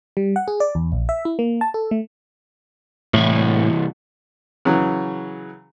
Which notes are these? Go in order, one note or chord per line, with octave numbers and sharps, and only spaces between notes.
G3
F#5
G#4
D5
E2
A#1
E5
E4
A#3
A5
A4
A3
C2 A2 E3
C#3 E3 F#3